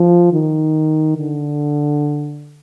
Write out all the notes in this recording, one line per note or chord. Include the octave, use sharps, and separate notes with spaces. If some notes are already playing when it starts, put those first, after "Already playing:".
Already playing: F3
D#3
D3